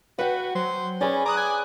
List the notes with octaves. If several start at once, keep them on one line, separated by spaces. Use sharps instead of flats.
F#4 B4 F#5 G5
F#3 C5
C#4 G#4 B4 D5
A#5 D6 D#6 F#6
G#5